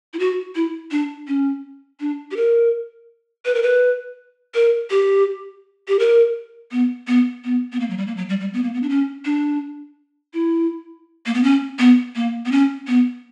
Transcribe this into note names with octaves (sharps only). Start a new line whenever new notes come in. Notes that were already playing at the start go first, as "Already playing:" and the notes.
E4
F#4
E4
D4
C#4
D4
G4
A#4
B4
A#4
B4
A#4
G4
G4
A#4
B3
B3
B3
B3
A#3
F#3
G3
A#3
F#3
G3
G3
B3
A#3
B3
D4
C#4
D4
E4
A#3
B3
C#4
B3
A#3
B3
C#4
B3